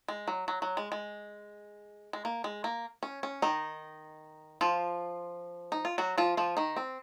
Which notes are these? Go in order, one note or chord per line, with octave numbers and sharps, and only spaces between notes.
G#3
F#3
F#3
F#3
G#3
G#3
G#3
A#3
G#3
A#3
C#4
C#4
D#3 D#4
F3 F4
D#4
F4
F#3 F#4
F3 F4
F3 F4
D#3 D#4
C4